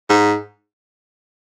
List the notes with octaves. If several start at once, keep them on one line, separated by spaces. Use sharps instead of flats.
G#2